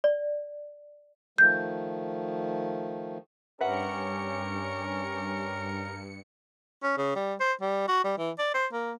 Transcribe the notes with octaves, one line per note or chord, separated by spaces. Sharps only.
D5
D#3 F3 A3 G6
G2 C#4 G4 A#4 B4 E5 F#5 C#7
C#4
C#3
G3
C5
G3
F#4
G3
E3
D5
C5
A#3